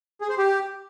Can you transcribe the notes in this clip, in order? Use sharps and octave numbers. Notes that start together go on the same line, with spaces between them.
G#4
C5
G4